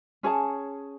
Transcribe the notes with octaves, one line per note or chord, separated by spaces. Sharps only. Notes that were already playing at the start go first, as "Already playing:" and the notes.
C#4 G#4 C#5 A5